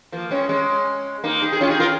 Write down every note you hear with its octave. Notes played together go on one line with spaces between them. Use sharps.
F3 A#3
G#3 C#4
G#3 C#4
A#3 D#4
D#4 G#4
G#4
C#4 F4
D#4 G#4
F4 A#4